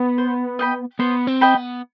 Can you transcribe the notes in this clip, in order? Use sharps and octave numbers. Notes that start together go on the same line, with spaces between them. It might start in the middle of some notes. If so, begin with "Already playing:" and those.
Already playing: B3
C5
D#5 G5 B5
B3 C5
C4
D#5 G5 B5
B3